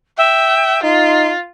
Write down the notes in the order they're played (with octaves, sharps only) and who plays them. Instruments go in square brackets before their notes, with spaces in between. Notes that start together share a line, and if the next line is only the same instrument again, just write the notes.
[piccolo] E5 [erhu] G5
[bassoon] D#4 [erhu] F4 [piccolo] C6